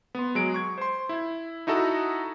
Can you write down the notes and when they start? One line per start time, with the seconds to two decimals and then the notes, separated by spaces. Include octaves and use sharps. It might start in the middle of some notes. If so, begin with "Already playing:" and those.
0.15 B3 C6
0.35 F#3 G#3 D7
0.54 C#6 G#6
0.78 C5 C6
1.09 E4 G#6
1.67 D#4 E4 F#4 A4 A#5 D#6